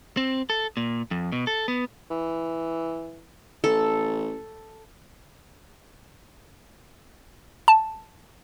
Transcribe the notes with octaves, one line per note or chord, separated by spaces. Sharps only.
C4
A4
A#2
F2
B2
A4
B3
E3
A1 A4
A5